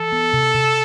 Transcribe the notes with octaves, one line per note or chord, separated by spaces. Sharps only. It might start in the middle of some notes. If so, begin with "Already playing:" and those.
Already playing: E3 A4
B3
C3
C3